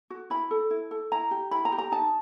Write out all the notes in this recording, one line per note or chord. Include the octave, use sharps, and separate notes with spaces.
F#4
E4 B5
A4
E4
A4
E4 A#5
G4
E4 B5
A#5
G4
A#5
D#4 A5